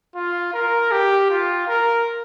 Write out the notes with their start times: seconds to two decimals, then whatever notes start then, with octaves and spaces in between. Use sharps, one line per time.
0.15 F4
0.54 A#4
0.91 G4
1.30 F4
1.68 A#4